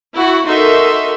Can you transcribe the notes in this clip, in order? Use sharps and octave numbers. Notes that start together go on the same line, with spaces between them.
E4 F#4 F#5
D#4 F#4 A4 A#4 E5 C6